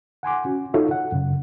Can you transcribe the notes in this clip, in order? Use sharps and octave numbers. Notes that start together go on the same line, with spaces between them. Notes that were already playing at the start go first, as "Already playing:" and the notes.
F#5 G#5 C6 D6
C#4 F#4
D#4 F4 F#4 A4 C#5 E5
F#5
F#2 C#3